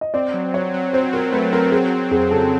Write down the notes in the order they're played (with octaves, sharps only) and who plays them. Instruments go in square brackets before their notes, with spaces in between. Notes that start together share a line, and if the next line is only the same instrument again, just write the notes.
[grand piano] D#5
[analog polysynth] C4 [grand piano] D5
[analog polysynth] F#3
[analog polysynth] F#3 [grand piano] C#5
[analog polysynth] F#3
[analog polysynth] C4 [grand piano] C5
[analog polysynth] F#3 [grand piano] A#4
[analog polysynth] A3 [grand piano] B4
[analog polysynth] C4 [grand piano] A#4
[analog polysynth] F#3 [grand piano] G#4
[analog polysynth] F#3
[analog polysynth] F2 [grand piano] G#4
[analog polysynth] C#3 [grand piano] A4